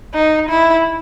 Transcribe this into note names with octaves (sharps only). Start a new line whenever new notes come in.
D#4
E4